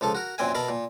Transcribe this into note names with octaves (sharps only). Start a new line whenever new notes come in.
C#2 F3 A4 A5
F#4 A#4
F#2 A#2 C4 E5 G5 G#5
B2 A#4 E5 A5 B5
A#2